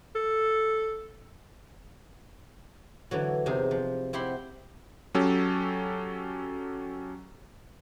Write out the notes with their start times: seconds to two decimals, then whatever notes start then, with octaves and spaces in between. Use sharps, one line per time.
0.15 A4
3.11 D3 E3 F#3
3.46 E2 C3 D#4 G#4
3.71 F3
4.13 C4 E4 G4 E5 F#5 C6
5.14 F#3 C#4 G4 A4